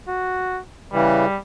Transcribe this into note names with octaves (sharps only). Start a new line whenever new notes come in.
F#4
C#3 E3 G3